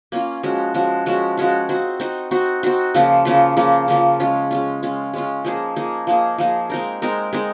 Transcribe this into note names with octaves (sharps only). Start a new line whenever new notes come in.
A#3 C#4 F4
F3 G#3 C#4 F#4
F3 G#3 C#4 F#4
F3 G#3 C#4 F#4
F3 G#3 C#4 F#4
C4 D#4 F#4
C4 D#4 F#4
C4 D#4 F#4
C4 D#4 F#4
C#3 F3 A#3 F4
C#3 F3 A#3 F4
C#3 F3 A#3 F4
C#3 F3 A#3 F4
G#3 C#4 F4
G#3 C#4 F4
G#3 C#4 F4
G#3 C#4 F4
F3 A#3 D#4 G#4
F3 A#3 D#4 G#4
F3 A#3 D#4 G#4
F3 A#3 D#4 G#4
G#3 C4 D#4 A#4
G#3 C4 D#4 A#4
G#3 C4 D#4 A#4